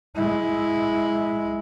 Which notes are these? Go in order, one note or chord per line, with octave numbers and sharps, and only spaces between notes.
G#3 E4